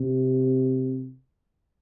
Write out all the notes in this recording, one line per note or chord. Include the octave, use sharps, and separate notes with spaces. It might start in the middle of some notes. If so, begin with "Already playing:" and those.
Already playing: C3